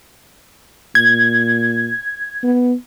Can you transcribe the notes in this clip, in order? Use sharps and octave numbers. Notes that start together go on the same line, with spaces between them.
A#2 G#6
B3